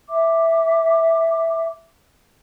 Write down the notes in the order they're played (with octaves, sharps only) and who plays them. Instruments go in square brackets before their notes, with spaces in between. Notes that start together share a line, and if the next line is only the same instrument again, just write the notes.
[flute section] E5 D6